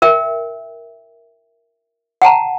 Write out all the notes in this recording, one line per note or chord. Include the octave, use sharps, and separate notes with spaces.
A#4 E5 G5
F#5 G5 A5 A#5